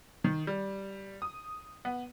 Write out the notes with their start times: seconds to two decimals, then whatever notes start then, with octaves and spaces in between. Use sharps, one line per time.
0.24 D#3
0.47 G3
1.22 D#6
1.85 B3